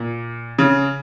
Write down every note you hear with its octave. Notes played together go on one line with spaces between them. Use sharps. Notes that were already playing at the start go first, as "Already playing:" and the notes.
Already playing: A#2
C#3